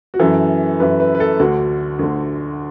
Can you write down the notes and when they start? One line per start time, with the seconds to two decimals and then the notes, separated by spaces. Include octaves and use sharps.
0.14 F#4
0.19 F#2 E3 A4
0.80 F#2 E3 B4
1.00 B4
1.15 B4
1.20 A4
1.40 D2 D3 F#4
1.99 D2 D3